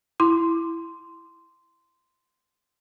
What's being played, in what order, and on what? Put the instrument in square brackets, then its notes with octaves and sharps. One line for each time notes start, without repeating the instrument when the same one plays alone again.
[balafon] E4 [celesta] C6